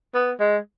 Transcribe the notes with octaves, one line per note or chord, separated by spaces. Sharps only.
B3
G#3